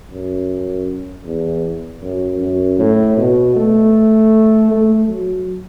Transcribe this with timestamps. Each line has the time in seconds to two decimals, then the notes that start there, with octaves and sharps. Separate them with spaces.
0.11 F#2
1.25 E2
2.02 F#2
2.40 F#2
2.79 A2
3.17 B2
3.56 A3
4.71 A3
5.08 F#3